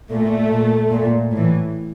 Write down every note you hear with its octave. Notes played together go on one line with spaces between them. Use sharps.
A#2 A3
A#2
A#2
A2 E3